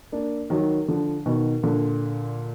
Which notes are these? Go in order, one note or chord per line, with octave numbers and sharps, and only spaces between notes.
A#3 D4
D#3 F#3
D3 F3
B2 D#3
A#2 D3